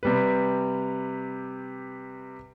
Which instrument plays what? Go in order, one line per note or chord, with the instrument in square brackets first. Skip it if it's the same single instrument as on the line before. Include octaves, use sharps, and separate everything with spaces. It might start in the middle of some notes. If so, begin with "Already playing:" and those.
[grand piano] C3 G3 B4